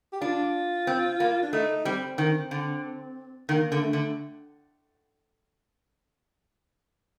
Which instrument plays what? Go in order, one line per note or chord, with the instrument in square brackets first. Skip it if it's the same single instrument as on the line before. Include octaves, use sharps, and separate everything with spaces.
[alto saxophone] G4
[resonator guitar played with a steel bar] D4 [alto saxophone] F4
[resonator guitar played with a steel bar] C4
A#3
[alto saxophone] D4
[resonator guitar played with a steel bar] A3 [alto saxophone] D#4
[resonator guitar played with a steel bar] G3 [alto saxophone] C4
[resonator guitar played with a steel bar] D#3
D3
[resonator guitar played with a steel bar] D#3 [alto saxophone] A#3
[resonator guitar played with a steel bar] D3
[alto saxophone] A3
[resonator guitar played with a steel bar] D3